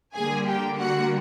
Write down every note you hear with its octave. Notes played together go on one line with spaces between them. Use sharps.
D3 G3 A#3 G#4 G#5
G4 G5
F#4 F#5